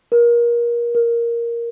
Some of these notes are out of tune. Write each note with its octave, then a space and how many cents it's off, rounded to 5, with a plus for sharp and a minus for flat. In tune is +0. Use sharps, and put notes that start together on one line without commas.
A#4 +25
A#4 +5